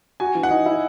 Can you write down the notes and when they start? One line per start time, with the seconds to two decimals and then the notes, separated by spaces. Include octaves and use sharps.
0.20 F#4 G#5
0.35 E3
0.43 F#5
0.50 D#4
0.66 E4